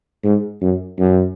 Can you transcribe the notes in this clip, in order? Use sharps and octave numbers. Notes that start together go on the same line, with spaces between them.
G#2
F#2
F#2